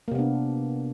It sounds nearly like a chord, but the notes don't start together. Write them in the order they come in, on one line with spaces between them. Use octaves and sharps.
A#3 C3 B3 D4